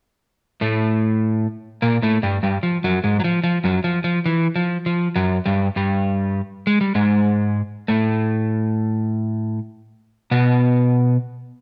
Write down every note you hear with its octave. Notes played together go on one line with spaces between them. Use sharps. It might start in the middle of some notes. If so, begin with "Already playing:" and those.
A2 A3
A#2 A#3
A2 A3
G2 G3
G2 G3
F3
F#2 F#3
G#2 G#3
F#3
F3
F3
F#2 F#3
F3
F3
E3
F3
F3
F#2 F#3
G2 G3
G2 G3
G#3
G3
G#2 G#3
A2 A3
B2 B3